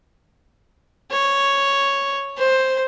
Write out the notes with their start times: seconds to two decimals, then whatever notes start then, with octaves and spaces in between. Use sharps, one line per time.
1.11 C#5
2.38 C5